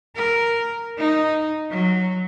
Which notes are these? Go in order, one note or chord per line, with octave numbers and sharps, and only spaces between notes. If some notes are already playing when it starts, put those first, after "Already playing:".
A#4
D#4
F#3